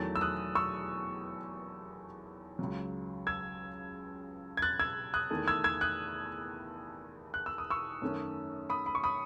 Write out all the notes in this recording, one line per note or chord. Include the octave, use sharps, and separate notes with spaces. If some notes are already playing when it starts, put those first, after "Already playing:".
Already playing: E2 D#3 F#3 A3 A6
E6
D#6 F#6
C#6 E6
C#2 C#3 F#3
E6 G#6
G#6
F#6 A6
E6 G#6
D#6 F#6
E2 D#3 A3
E6 G#6
E6 G#6
D#6 F#6
F#6
E6
D#6
C#6 E6
F#2 D#3 A3 C#4
B5 D#6
B5
C#6
B5 D#6